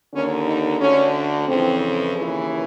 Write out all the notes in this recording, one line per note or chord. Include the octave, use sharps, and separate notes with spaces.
D#2 D3 C#4
D#4
D2 D3 C#4
F2 C#3 E3 C4
D#2 C#3 E3